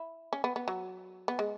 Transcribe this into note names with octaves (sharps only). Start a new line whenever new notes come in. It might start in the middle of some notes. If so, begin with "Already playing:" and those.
Already playing: E4
C#4
B3
B3
F#3
B3
G#3